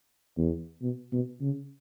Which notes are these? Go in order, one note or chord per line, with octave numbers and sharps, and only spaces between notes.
E2
B2
B2
C#3